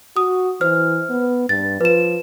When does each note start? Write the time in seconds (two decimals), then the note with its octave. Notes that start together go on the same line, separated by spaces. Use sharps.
0.17 F#4 D#6
0.61 E3 C5 F6
1.10 B3
1.49 G2 A6
1.81 F3 B4 E7